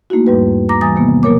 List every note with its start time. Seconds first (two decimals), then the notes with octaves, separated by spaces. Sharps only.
0.10 A3 A#3 D#4 E4 F#4
0.27 E2 G#2 G3 B4
0.69 A#5 D6 A#6
0.81 E3 G3 G#5 A#5 D#6 A6
0.96 C3 D#3 A#3 B3
1.23 B2 F#3 A#3 A#4 C#5 D6